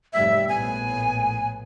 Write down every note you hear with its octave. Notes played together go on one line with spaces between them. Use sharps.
F1 G#2 G3 E5
A#1 A2 B3 G#5